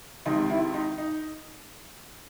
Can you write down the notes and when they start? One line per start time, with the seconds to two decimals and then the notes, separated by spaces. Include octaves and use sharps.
0.25 C#2 C3 D#3 D#4
0.50 E4
0.74 D#4
0.98 D#4